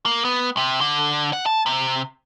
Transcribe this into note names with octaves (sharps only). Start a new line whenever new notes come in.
A#3
B3
C3
D3
F#5
A5
C3